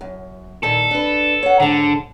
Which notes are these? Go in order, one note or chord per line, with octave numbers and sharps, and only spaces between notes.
F#2
A#2 D#3 A4
D4 B4
C#5 F#5
G#2 D3 A5